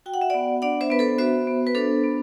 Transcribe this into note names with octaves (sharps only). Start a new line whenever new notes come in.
F#4 G5
F#5
E5
B3 D5 F#5
D4 D5 F#5
C5 E5
B3 B4
A4 C5
F#4 C5 E5
B3
B4
D4 A4 C5
B3